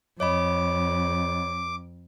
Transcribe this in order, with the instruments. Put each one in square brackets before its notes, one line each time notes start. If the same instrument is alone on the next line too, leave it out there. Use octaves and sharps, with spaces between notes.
[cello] F2 [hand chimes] C#5 D#5 B5 [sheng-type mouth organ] D6